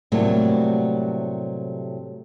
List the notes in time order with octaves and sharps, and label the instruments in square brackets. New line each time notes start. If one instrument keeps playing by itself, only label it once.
[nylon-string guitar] A2 C3 F#3 G3 A3 A#3